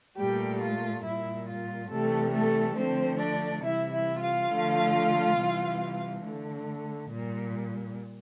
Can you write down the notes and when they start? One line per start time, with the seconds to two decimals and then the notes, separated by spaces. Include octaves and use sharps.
0.17 A#2 G3 A3 G4
0.61 F4
1.04 A#2 G3 E4
1.47 F4
1.90 C3 E3 G3 A3 A4
2.33 A3 A4
2.76 D3 F3 A3 C4 C5
3.20 D4 D5
3.63 C3 E3 G3 E4 E5
3.92 E4 E5
4.21 F4 F5
4.50 D3 F3 A3
5.37 C3 E3 G3
6.23 D3 A3
7.09 A#2 G3